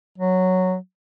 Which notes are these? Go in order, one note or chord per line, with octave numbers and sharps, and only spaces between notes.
F#3